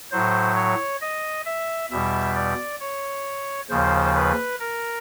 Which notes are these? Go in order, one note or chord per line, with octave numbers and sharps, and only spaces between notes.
A2 F#3 C5
C#5
D#5
E5
E2 B2 G3 E5
D5
C#5
D#2 C#3 F3 C5
B4
A#4